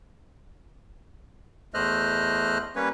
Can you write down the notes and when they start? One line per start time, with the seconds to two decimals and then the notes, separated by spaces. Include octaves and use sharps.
1.74 E2 A3 C5 D#5 F6 F#6
2.76 G3 A#3 C#4 B4 C#5